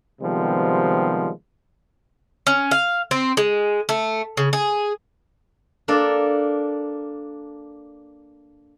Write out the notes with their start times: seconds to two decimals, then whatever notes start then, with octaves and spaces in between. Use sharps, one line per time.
0.21 C3 D#3 F3 G3 G#3 B3
2.47 C#4
2.71 F5
3.11 C4
3.37 G#3
3.89 A3
4.37 C#3
4.53 G#4
5.88 A#3 D4 A4 A#4